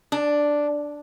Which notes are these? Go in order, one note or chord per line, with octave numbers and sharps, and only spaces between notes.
D4